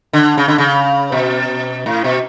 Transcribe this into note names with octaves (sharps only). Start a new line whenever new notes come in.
D3
C#3
D3
C#3
B2
A2
B2